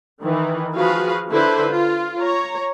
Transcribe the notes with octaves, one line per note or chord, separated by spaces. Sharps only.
D#3 E3
F3 F#4 G#4 B4 F5
D3 E4 B4 C5
F4
C#5 A#5